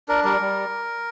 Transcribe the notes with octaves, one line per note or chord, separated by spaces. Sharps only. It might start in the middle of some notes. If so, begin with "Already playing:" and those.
D4 A#4
G3 A#4
G3